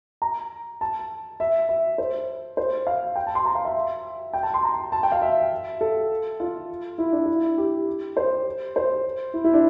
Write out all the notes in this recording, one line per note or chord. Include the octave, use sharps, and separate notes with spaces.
A#5
A5
E5
E5
C5
C5
F5
G5
A5
C6
A#5
F5
E5
G5
A5
C6
A#5
A5
G5
F5
E5
A4
F4
E4
D4
E4
G4
C5
C5
E4
E4
D4